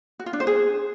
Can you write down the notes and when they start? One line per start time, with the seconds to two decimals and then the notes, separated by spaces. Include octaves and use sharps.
0.19 F#4
0.26 F4
0.33 D4
0.40 C5
0.47 G#4